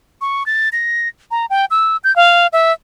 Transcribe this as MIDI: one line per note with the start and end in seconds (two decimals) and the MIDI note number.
0.21 0.46 85
0.46 0.69 93
0.72 1.08 94
1.31 1.46 82
1.50 1.65 79
1.71 1.97 88
2.04 2.14 91
2.16 2.47 77
2.53 2.73 76